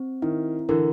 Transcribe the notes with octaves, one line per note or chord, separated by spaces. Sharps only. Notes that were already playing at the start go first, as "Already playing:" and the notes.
Already playing: C4
D#3 E4
D3 E3 A#4